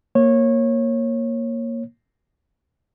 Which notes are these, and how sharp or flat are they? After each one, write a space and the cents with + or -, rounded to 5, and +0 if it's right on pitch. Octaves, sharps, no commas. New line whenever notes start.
A#3 +0 C#5 -20